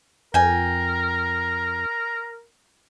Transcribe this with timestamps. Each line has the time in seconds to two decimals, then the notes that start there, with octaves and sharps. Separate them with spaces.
0.34 F2 A#4 G5 G#5